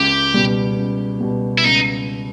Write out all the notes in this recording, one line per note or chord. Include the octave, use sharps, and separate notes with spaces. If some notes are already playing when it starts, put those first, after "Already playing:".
Already playing: C#2 G4
B2 G3
C#2
B2 G3
E4
C#2 D#4